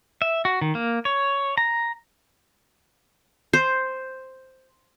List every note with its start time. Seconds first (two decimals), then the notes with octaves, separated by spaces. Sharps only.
0.22 E5
0.45 F#4
0.61 D#3
0.75 A#3
1.05 C#5
1.58 A#5
3.53 C5